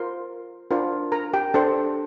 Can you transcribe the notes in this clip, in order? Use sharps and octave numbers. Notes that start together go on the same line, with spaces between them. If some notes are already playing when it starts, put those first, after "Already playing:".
Already playing: F4 A#4 C5 C6
D4 F4 A#4 C5 A#5
A#4 A#5
G4 G5
D4 G4 A4 C5 A5